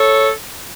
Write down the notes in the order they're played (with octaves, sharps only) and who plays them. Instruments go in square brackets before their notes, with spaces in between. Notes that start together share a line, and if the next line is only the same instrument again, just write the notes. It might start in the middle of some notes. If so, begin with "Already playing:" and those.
Already playing: [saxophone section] A4 C#5